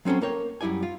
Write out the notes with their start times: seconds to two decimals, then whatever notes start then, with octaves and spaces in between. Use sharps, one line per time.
0.05 F#3 C4 C#4 A4 C5
0.21 A#3 A#4 C#5 G5
0.61 F#2 G3 E4 D5 G#5
0.83 F4